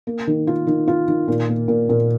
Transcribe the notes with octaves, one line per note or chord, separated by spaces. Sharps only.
A#3
D#3
F4
D#3
F4
D#3
A#2
A#3
A#2
A#2